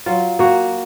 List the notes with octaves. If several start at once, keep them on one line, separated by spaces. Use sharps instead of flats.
F#3 F4
A#3 F#4